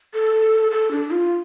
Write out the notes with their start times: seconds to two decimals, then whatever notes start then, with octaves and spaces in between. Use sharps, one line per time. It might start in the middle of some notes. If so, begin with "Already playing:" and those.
0.14 A4
0.71 A4
0.91 D4
1.11 F4